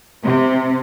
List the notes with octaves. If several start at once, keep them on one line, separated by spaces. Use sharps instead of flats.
C3